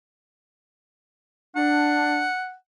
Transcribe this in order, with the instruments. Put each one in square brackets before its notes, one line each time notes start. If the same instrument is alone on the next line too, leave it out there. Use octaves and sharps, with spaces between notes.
[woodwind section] D4 [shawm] F#5